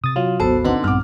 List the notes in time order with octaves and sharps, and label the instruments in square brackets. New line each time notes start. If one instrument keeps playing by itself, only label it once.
[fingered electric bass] C3 [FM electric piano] D#6 A6
[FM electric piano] F#3 [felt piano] F4
[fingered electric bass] G#1 D2 [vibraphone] B3 F#4 C5 [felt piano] A4
[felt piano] D3 [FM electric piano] B3 D#4 [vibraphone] C4 F#5
[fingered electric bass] A#1 G2 [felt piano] D6 F6